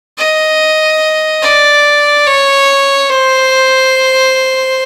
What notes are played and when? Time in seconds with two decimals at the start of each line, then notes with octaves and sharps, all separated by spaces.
0.18 D#5
1.43 D5
2.26 C#5
3.10 C5